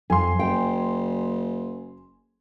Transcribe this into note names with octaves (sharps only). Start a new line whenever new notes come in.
F2 G#5 C6
F#1 G5